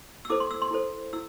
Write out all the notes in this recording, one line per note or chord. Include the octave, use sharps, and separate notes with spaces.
E6
E4 A4 C5 D6
C6
E6
C6
E4 A4 C5
E4 E6